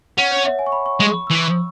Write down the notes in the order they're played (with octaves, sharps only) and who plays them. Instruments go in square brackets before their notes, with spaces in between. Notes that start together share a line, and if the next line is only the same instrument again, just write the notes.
[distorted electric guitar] C#4 [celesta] F#5
[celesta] C#5
E5
G#5
C#6
B5
C#6
[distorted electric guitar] G#3 [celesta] C#6
[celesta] B5
E6
[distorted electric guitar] E3
[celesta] C#6